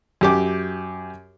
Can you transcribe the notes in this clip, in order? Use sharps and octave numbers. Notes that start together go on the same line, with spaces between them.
F#2 G4 D6